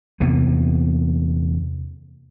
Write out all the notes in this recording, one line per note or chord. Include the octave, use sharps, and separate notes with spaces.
E2 C3 A#3 B3